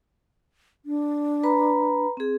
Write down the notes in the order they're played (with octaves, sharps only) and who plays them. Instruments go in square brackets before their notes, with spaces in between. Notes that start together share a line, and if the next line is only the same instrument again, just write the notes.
[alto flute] D4
[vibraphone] B4 A#5 B5
C4 G#4